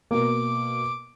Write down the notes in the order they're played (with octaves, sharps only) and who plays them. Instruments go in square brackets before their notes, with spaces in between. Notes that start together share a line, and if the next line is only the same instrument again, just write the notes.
[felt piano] B2 A#3 [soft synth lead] D6